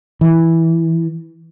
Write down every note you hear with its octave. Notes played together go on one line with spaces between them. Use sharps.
E3